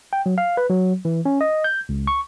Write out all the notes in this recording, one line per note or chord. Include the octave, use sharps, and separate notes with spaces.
G5
F#3
F5
B4
F#3
E3
C#4
D#5
G6
C#2
C#6